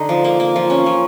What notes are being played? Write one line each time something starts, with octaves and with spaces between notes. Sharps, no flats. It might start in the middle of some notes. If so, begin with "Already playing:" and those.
Already playing: D3 D#4
F3
A#3
A#3
F3
C#4
F3